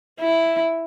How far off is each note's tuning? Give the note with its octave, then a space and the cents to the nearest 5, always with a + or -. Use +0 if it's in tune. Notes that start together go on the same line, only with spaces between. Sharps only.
E4 +0